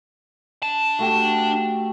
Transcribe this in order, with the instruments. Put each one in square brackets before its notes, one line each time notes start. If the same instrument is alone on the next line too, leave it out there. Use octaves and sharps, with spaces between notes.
[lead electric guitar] D4 A5
[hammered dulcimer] A3 F#4 G4